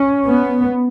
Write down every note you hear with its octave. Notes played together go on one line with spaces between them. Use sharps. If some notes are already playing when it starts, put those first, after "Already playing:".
Already playing: C#4
B3